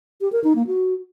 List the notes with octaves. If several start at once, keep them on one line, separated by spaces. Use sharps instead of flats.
G4
A#4
D#4
A#3
F#4